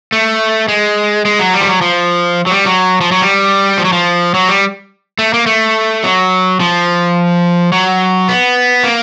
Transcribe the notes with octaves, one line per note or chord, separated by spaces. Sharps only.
A3
G#3
G#3
F#3
G3
F3
F#3
F3
F#3
G3
F#3
F3
F#3
G3
F3
F#3
F3
F#3
G3
A3
A#3
A3
F#3
F3
F#3
B3
A#3